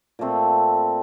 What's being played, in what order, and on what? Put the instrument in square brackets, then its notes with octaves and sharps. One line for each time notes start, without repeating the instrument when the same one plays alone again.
[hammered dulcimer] A#2 A3 C4